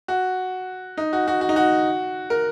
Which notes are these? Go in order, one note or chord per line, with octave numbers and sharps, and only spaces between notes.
F#4
D#4
F#4
F#4
F#4
D#4
F#4
A#4